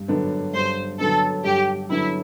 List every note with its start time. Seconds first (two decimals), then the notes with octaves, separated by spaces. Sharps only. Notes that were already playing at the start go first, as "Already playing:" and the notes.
Already playing: G2
0.08 D3 F#3 B3 D4
0.53 G2 C5
0.99 D3 F#3 B3 D4 A4
1.44 G2 G4
1.90 D3 F#3 B3 D4 E4